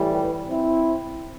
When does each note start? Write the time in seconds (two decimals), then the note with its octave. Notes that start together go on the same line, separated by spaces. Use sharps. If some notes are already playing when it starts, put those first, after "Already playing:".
Already playing: A2 E3 G3
0.11 G4 B4
0.48 C4 E4